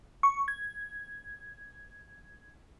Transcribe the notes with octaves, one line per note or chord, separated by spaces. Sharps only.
C#6
G#6